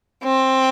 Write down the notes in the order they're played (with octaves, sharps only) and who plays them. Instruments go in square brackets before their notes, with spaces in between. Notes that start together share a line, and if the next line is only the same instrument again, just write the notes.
[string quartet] C4